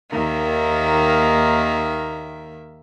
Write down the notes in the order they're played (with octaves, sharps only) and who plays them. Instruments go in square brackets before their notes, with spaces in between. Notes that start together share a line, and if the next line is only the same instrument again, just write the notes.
[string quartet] D#2 D#3 A#3 E5